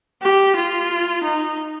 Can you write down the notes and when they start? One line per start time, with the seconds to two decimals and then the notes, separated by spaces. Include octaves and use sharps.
0.22 G4
0.56 F4
1.23 D#4